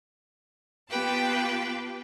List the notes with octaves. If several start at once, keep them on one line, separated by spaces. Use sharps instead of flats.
B3 F4 G4 B4 G5 A5